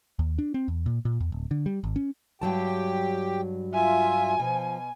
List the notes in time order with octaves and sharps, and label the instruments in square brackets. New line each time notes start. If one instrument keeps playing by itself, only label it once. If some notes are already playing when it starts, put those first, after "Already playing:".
[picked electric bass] D#2
D4
C4
E2
A#2
A#2
E2
D1
D3
G3
G#1
C#4
[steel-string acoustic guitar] G2 F#3 A5 [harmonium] G4 G5
[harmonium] F4 E5 [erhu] G#5
[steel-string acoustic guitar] B2 [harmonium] F3